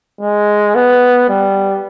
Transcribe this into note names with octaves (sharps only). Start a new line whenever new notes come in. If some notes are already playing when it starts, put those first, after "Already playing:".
G#3
B3
G3